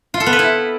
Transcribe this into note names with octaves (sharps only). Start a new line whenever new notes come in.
F4
A4
B3
B4
E4